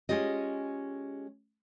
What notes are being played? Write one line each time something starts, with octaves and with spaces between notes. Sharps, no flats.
G#3 C#4 F4 G4 D#5